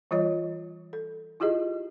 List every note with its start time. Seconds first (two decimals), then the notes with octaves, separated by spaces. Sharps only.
0.11 E3 G3 F4 C#5 D#5
0.93 A4
1.40 E4 F4 G4 G#4 D#5